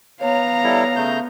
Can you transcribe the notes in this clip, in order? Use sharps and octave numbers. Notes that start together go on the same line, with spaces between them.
B3 C#5 F5 A#5
G3 E4 A4
C#3 A3 G6